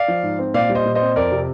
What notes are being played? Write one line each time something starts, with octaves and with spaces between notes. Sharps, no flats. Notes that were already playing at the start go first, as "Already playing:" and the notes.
Already playing: D5 F5
F3
G#2
C4
A#2 D5 F5
G3
C5 D#5
A#2
C5 D#5
C4
F2 A#4 D5
C3